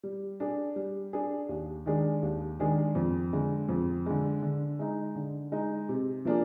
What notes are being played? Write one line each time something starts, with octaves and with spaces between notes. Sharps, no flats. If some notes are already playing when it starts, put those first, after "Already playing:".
G3
D4 G#4
G3
D4 G#4
D#2
D#3 G#3 D4 G#4
D#2
D#3 G#3 D4 G#4
F2
D3 G#3
F2
D3 G#3
D3
G#3 D#4
D3
G#3 D#4
C3
F3 A#3 D4 G#4